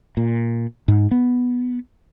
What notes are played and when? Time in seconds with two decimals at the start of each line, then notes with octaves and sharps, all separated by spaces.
0.17 A#2
0.88 G#2
1.11 B3